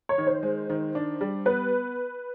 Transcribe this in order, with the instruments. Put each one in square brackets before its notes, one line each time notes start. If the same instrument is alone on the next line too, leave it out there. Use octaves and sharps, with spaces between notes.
[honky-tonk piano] C#5
[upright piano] D#3
[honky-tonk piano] C5
[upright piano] G#3
D#3
D4
G3
[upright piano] B3 [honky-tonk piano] B4